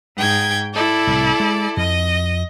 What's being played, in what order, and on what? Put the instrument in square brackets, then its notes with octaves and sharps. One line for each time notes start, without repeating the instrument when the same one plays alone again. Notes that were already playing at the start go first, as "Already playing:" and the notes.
[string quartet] G#2 G5 G#6
E4 A4 D5
[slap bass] C2 A2
G#3
[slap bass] F2 [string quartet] D#5